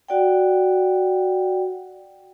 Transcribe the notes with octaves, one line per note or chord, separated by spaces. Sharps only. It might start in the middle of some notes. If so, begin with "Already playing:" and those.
F#4 D5 F#5 G5